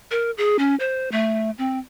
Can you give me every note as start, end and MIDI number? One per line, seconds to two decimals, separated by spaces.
0.11 0.31 70
0.37 0.57 68
0.59 0.75 61
0.80 1.11 72
1.12 1.51 57
1.58 1.79 60